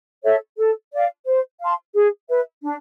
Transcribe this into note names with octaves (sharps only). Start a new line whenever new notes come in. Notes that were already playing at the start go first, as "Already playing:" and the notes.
A4 C#5 E5
A4
D5 F5
C5
F5 A5 C6
G#4
B4 E5
D4